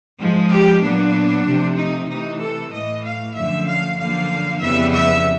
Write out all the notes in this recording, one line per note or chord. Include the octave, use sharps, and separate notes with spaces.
G#2 F3 G#3
G4
A#2 F#3 B3 D4
C3 F3 A3
D#4
C3 E3 A3 D#4
A4
A2 E3 A3 D#5
F5
F#2 D3 F3 A3 E5
F5
F#2 D3 F3 A#3 F5
F2 C#3 E3 G3 B3 E5
E5